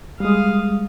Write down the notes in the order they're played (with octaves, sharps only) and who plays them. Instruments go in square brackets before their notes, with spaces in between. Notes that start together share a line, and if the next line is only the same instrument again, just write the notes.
[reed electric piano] G3 G#3 [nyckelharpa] F5 D#6